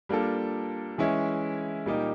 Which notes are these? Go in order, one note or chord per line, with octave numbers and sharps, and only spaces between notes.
G3 A#3 D4 F4 A4
E3 G#3 C#4 E4
A#2 G3 A#3 D#4 G4